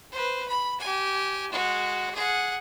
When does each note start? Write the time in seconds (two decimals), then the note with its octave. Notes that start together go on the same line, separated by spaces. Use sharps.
0.12 B4 C5
0.48 B5
0.80 G4 G#5
1.51 G#3 F#4
2.15 G#4 F#5